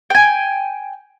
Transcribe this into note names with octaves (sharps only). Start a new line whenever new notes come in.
G5 G#5